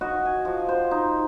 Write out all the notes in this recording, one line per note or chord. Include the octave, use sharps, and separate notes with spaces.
F#4 D#5 C#6
G#5
F3
C5
D#4